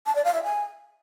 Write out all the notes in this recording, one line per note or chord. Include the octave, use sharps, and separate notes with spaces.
A5
D5
F5
E5
G#5